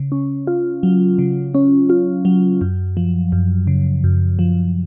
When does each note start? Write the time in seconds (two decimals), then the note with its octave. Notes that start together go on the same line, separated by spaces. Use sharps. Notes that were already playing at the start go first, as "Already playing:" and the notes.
Already playing: C#3
0.12 C#4
0.47 F4
0.83 F#3
1.19 C#3
1.55 C#4
1.90 F4
2.25 F#3
2.61 F#2
2.97 F3
3.32 F#2
3.67 C#3
4.04 F#2
4.39 F3